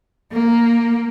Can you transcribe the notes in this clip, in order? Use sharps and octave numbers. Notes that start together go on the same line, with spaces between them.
A#3